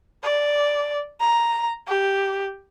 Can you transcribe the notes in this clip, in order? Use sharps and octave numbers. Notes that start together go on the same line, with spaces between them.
D5
A#5
G4